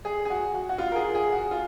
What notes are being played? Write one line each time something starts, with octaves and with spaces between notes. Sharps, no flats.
G#4
G#4
F#4
F#4
F#4
F4
A#4
G#4
G#4
F#4
F4